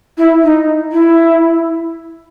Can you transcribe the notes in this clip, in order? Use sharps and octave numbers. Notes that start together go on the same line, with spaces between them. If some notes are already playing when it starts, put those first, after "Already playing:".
E4
D#4
E4